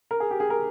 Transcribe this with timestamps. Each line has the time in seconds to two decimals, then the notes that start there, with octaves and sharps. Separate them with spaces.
0.11 A#4
0.20 G#4
0.31 G4
0.40 G#4
0.50 A#4